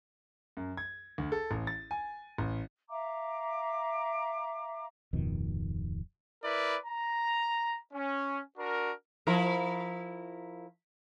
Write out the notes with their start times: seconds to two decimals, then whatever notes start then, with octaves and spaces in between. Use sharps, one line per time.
0.57 F#2
0.77 G#6
1.18 D2
1.32 A4
1.51 A1
1.67 A6
1.91 G#5
2.38 A1
2.89 E5 F5 A#5 D6
5.13 D1 F2 B2 D#3
6.43 E4 A#4 B4 D5
6.87 A#5
7.93 C#4
8.58 D4 F#4 A#4
9.27 F3 E4 A#4